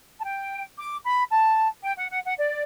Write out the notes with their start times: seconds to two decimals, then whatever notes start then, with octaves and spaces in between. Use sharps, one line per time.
0.20 A5
0.25 G5
0.78 D6
1.04 B5
1.30 A5
1.84 G5
1.98 F#5
2.11 F#5
2.24 F#5
2.38 D5